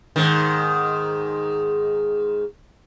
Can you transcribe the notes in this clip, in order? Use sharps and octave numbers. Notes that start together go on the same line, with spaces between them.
G#2 D#3